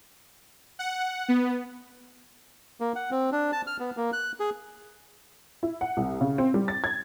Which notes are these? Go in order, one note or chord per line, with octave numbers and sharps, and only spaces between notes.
F#5
B3
A#3
F#5
C4
D4
A5
F6
B3
A#3
F#6
G#4
E4
F#5
C2
C#3
C4
G3
A6
G#6